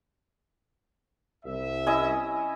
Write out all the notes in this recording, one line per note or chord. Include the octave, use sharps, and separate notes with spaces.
C2 E5
C#4 E4 D#5